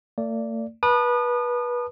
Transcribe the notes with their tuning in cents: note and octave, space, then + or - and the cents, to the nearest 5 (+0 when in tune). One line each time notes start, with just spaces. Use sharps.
A3 +45 D5 -10
B4 -25 A5 +0 D#6 -35